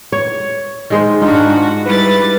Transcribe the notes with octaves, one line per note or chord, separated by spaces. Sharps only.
C#5
D#3 G#3 C5
G#2 D4 D#4 F4 F#4
G3 E4 B4 A6